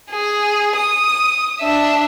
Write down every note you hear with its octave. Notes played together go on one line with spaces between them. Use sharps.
G#4
D#6
D4 E5